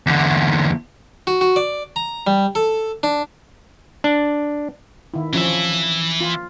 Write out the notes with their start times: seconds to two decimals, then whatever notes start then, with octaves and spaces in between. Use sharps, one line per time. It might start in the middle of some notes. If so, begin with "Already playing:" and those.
0.07 E2 D3
1.27 F#4
1.41 F#4
1.56 D5
1.96 A#5
2.27 G3
2.55 A4
3.03 D4
4.04 D4
5.14 D#3 E4
5.33 E3 F3 C#4 E5
6.21 F4